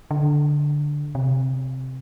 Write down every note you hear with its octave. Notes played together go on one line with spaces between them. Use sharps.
D3
C3